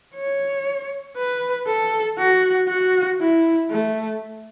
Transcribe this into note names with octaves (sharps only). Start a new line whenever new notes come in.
C#5
B4
A4
F#4
F#4
E4
A3